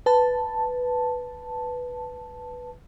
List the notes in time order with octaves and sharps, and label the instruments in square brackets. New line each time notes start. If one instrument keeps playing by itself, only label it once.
[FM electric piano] B4 A5